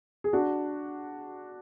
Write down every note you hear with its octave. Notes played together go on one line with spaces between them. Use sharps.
G#4
D4 F#4